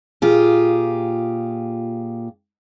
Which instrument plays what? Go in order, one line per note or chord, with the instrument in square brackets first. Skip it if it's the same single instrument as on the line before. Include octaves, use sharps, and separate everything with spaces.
[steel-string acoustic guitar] A#2 F4 G4 G#4